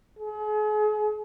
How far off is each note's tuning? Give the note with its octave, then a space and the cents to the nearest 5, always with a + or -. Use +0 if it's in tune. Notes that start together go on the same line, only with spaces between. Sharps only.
G#4 +40